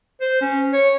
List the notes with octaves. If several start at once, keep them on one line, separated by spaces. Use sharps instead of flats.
C5
C#4
C#5